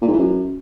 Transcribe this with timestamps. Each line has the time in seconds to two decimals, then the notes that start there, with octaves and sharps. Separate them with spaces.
0.02 A#2
0.07 G#2
0.13 E3
0.19 F#2